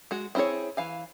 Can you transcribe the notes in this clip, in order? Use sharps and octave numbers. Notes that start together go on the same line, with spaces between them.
G#3 F#4
C4 E4 F#4 G#4 C#5
E3 F5 G#5